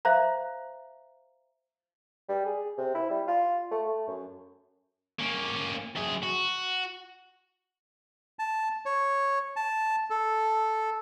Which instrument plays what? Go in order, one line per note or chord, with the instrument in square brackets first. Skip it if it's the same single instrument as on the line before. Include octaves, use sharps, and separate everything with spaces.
[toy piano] C5 E5 F5 A#5
[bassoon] G3
G#4
C3
E4
G3
F4
A3
A3
F#2
[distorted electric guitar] A#3 C#4
F#2 G#4
F#4
[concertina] A5
C#5
A5
A4